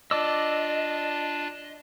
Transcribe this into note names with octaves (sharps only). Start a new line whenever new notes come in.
D4 F4 D5 D#5 A5 D6 E6